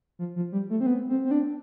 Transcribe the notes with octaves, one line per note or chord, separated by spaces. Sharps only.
F3
F3
G3
A3
C4
B3
C4
C4
D4